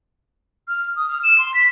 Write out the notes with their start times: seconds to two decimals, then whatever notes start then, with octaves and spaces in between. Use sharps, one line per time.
0.68 F6
0.96 D#6
1.08 F6
1.23 E7
1.38 C6
1.54 B6